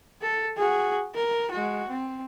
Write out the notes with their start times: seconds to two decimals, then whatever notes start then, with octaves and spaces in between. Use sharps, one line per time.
0.22 A4
0.57 F#4 G#4
1.15 A#4
1.51 G#3 F#4
1.89 C4